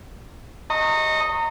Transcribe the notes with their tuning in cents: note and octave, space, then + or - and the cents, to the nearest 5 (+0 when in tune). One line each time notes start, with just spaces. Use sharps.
D#5 +0 A#5 -25 C#6 -20